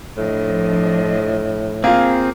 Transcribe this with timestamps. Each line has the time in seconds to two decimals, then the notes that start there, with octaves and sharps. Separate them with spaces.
0.17 A2 F3 D4 D#5
1.84 A#3 C4 F4 G#4